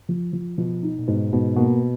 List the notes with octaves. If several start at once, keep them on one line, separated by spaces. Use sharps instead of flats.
F3
F3
B2 F3
D#4
A#2
G#2 B2
G#2 B2
B2 A#3